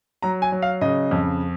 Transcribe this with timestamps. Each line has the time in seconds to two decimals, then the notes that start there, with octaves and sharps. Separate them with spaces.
0.22 F#3 A#5
0.42 G#5
0.52 F#3
0.62 F5
0.81 C#3 D#5
1.11 F2